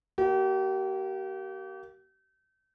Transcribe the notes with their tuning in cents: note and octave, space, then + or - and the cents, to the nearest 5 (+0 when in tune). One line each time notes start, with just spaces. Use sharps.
A#3 +0 G4 -40